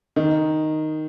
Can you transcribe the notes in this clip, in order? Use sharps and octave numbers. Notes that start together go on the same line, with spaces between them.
D#3